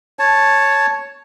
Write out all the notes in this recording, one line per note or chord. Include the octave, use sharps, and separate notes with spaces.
C#5 A5